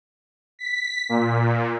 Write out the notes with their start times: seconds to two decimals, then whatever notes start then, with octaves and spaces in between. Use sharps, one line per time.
0.59 B6
1.09 A#2